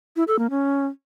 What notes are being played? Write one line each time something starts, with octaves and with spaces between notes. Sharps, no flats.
E4
A4
A#3
C#4